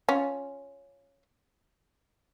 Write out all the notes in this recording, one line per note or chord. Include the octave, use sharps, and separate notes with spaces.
C#4 F4